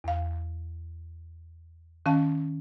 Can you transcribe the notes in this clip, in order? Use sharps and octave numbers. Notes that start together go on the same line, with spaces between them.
E2 F5
D#3 C#4 F5 A5